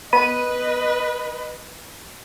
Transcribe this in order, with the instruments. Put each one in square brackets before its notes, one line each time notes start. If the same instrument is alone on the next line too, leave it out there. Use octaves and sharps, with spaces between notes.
[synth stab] B3 B5 D#7 [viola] B4 D#5